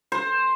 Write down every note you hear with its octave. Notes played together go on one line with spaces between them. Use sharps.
C5